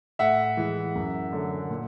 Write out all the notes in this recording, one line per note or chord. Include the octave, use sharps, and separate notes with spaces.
A2 E5 F#5
E3 G#3
F#2
D3 F#3
A#2